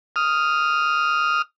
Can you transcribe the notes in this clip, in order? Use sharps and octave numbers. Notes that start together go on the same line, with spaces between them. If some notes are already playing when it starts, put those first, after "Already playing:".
D#6 F6